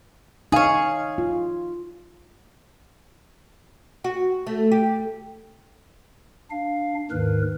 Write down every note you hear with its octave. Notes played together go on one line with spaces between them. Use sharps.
D#4 G#4 C#5 F5
F4
F#4
A3
G4
D4 F5
D#2 G#2 D#3 A#4 B4